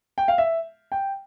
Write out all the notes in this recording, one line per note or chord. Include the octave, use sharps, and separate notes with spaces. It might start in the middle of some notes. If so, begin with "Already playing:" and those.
G5
F5
E5
G5